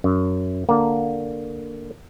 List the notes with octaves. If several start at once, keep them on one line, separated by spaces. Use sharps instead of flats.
F#2
D3 A#3